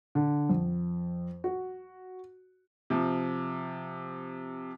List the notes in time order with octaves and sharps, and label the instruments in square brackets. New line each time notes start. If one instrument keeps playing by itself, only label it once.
[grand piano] D3
F2
F#4
[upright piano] C3 F3